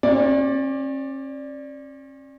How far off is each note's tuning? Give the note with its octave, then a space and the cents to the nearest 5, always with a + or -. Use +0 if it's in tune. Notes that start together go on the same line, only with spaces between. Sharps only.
C#4 -45 D5 +0